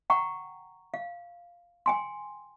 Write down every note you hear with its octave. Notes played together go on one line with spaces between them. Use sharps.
F#5 G5 A#5 C#6
F5
G5 G#5 C6